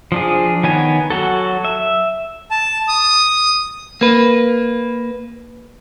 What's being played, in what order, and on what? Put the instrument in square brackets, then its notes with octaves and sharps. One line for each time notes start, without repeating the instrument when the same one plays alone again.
[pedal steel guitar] F3 D4 G#4
D#3 B3 C#5 G#5
F#3 F#4 A4
E5
[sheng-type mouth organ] A5
D#6
[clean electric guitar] A#3 B4